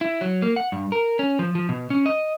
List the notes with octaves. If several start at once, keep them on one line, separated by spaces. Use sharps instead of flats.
E4
F#3
A#3
F#5
G2
A#4
C#4
F3
F3
B2
C#4
D#5